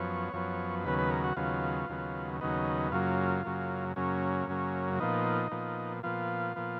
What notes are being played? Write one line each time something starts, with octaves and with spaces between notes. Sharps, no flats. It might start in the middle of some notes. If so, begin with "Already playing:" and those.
Already playing: F#2 F3 B3 C#5
F#2 F3 B3
D#2 C#3 F#3 B3 B4
B4
A#4
F#4
D#2 C#3 F#3 B3 F4
D#2 C#3 F#3 B3
D#2 C#3 F#3 B3 D#4
F#2 C#3 F#3 A#3 F4
F#2 C#3 F#3 A#3
F#2 C#3 F#3 A#3 C#4
F#2 C#3 F#3 A#3
A#2 F3 B3 D#4
A#2 F3 B3
A#2 F3 B3 F4
A#2 F3 B3